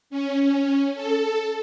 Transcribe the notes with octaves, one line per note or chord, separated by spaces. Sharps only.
C#4
A4